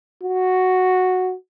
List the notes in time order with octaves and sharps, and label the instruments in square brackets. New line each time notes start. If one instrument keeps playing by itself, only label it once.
[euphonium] F#4